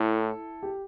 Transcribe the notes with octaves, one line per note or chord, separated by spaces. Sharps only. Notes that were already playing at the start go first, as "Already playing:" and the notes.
Already playing: A2 E4 A4
G4